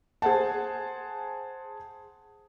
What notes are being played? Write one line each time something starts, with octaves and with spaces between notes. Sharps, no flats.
G#4 C5 F#5 A5